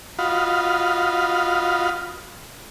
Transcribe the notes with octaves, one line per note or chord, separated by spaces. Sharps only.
F4 F#4 D#5 F5 B5